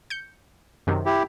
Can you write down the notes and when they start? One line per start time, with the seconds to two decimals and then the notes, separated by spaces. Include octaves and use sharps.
0.10 G6 C#7
0.87 F#2 C3 D#3
1.06 E4 G4